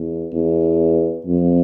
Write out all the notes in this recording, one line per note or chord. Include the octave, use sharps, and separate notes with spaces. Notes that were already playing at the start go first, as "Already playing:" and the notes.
Already playing: E2
E2
F2